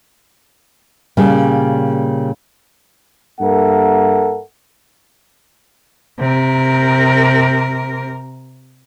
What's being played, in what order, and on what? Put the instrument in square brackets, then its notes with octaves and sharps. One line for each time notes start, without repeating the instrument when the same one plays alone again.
[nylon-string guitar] A#2 C#3 G3 A#3
[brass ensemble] G2 A#3 A4 A#4 E5 F#5
[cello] C3 A#4